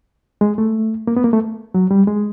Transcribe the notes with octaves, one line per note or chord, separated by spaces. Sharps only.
G#3
A3
A#3
B3
A#3
A3
F#3
G3
G#3